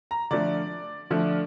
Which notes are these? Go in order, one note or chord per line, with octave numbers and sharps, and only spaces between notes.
A#5
D3 F3 A3 D5
D3 F3 A3